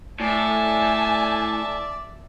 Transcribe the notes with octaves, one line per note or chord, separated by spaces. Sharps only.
A2 D5 E5 G#5 A5